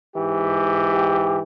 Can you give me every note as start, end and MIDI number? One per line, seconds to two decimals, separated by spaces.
0.17 1.43 44
0.17 1.43 52
0.17 1.43 67